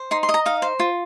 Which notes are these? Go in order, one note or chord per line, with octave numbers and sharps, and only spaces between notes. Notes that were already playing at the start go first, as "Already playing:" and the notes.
Already playing: C5
D#4 C6
C6
D#5
A#5
D#4 F5
C5
F4